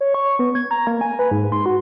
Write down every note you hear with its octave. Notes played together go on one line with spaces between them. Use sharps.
C#5
C#6
B3
G#6
A#5
A#3
G#5
B4
G#2
C6
F#4